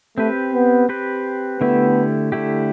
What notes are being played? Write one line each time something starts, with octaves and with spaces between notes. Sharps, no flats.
A3 C4 G4 B4
B3
C4 G4 B4
D3 A3 B3 E4 G4
D3 A3 E4 G4